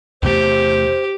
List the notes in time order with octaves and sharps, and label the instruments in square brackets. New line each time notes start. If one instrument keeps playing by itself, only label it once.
[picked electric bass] E2 C3 A3 [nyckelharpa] G4 [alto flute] C5